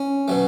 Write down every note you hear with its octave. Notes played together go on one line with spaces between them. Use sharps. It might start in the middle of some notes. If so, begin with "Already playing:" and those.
Already playing: C#4
B2 F#3 A3